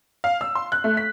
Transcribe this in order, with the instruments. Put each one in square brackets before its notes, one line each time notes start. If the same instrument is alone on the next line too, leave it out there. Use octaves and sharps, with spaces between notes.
[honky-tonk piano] F5
E6
C6
F#6
A3
B6